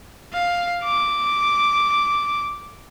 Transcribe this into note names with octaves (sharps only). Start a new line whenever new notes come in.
F5
D6